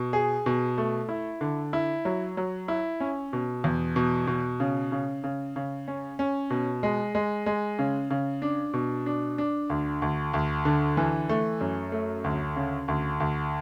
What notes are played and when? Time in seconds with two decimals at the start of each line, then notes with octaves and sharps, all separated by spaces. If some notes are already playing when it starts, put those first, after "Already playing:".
Already playing: B2
0.13 G#4
0.46 B2
0.78 A3
1.09 E4
1.41 D3
1.73 E4
2.05 F#3
2.37 F#3
2.68 E4
3.00 C#4
3.33 B2
3.64 E2
3.96 B2
4.27 B2
4.60 C#3
4.92 C#3
5.24 C#3
5.56 C#3
5.88 C#4
6.19 C#4
6.50 B2
6.83 G#3
7.15 G#3
7.46 G#3
7.79 C#3
8.10 C#3
8.42 D4
8.73 B2
9.06 D4
9.38 D4
9.70 D2
10.02 D2
10.33 D2
10.65 D3
10.97 E3
11.29 A3
11.61 F#2
11.92 A3
12.24 D2
12.56 C#3
12.88 D2
13.20 D2